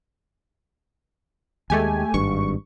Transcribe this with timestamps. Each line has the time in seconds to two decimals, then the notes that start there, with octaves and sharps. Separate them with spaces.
1.70 D#2 G#3 A3 G4 G#5
2.14 G#1 G2 C#6